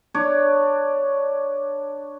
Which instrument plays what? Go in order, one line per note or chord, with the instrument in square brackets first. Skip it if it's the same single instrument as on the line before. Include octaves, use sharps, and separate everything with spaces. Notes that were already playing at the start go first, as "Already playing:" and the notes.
[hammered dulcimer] D4 C#5 D5